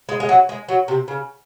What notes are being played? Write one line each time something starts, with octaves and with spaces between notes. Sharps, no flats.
G#3
G#3
F#3
G#3
F#3
C3
C#3